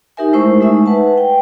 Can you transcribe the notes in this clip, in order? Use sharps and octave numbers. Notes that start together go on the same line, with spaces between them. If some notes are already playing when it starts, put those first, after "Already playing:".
D#4 G4 A#4 E5 G#5
G#3 A3 E4 C5 E5 C#6
G#3 A3 D#4 E5 G#5
B4 F#5 A5
G5